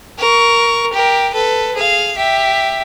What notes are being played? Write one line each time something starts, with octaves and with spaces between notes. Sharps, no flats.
A#4 C#6
G4 A#4
A4 B4
G#4 F5
G4 E5